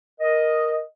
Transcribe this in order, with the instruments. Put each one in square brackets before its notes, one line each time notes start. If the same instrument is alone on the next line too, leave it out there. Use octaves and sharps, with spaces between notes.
[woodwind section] A#4 D#5